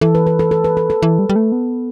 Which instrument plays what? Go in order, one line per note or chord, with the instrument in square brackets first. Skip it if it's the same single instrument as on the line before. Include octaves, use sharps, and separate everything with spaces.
[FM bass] E3 [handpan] A4
[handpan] B4
B4
A4
A4
B4
A4
A4
[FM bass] E3
G3
G3
A3
B3